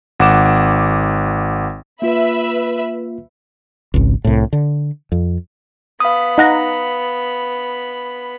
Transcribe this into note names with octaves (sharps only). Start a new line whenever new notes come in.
G#1 F#5 D6 E7
A#3 F4 B4 E5 B5
G#1 C#2
C2 A2
D3
F2
B3 F5 B5 D#6
D#4 F#5 A#5